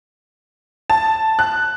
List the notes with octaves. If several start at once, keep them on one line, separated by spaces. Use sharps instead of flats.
A5
F#6